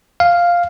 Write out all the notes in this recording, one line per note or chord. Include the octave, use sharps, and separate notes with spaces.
F5